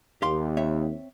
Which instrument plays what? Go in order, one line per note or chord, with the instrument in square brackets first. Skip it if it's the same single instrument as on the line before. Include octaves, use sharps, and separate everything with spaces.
[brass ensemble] D#2 [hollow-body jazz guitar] G4 F5 C6
[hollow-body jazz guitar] C4 C#5 E5